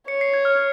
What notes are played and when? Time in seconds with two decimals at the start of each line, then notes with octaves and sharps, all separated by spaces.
0.08 C#5 C#7
0.21 C7
0.34 G#6
0.45 F6